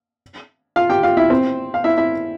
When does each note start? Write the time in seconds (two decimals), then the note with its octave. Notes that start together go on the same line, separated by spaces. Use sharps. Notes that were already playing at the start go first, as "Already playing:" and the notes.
0.76 F4 F5
0.90 G4 G5
1.03 F4 F5
1.17 E4 E5
1.30 C4 C5
1.74 F5
1.84 E4 E5
1.97 E4 E5